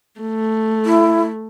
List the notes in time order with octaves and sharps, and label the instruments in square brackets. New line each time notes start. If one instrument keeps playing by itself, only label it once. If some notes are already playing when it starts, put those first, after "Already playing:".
[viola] A3
[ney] E4